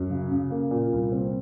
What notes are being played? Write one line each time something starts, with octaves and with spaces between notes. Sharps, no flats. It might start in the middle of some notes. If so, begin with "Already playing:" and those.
Already playing: F#2
C#3
C#3
A#3
A#2
C2
C4